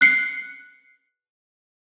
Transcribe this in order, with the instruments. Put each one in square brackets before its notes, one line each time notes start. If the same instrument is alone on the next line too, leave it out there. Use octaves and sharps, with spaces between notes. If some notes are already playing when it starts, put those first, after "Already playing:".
[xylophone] F#6 C7 C#7